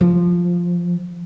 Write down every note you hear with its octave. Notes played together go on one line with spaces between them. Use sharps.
F3